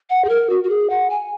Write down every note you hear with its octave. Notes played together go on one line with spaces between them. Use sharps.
F#5
G#4
A#4
F#4
F#4
G#4
F#5
G#5